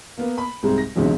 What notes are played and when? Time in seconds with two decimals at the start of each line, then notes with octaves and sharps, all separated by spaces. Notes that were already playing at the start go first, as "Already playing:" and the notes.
0.18 A#3 B3
0.38 B5
0.63 C2 G#2 G3 C4
0.78 A#6
0.96 G#1 C#2 G2 B2 E3 F#3